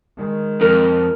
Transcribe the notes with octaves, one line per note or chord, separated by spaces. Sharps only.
D#3 G#3
F2 A#4